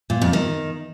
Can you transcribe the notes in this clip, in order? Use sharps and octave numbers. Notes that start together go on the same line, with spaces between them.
A#2
F2
D#3